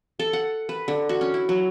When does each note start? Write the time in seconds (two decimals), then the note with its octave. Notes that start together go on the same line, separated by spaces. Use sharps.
0.19 A4
0.33 F#5
0.69 B4
0.88 D3
1.09 F#4
1.21 C#4
1.34 E4
1.49 F#3